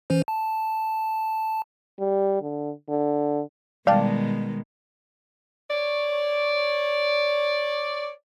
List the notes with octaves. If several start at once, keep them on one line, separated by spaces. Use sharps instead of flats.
E3 C#4 C5
A5
G3
D3
D3
B2 D#3 G3 G#3 D5 F5 G5 A5
C#5 D5